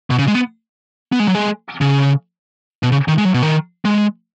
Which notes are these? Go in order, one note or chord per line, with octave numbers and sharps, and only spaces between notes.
B2
C#3
G#3
B3
B3
G#3
F#3
G#3
C#3
B2
C#3
D#3
G#3
F#3
B2
D#3
G#3